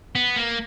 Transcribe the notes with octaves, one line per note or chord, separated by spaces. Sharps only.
B3
A#3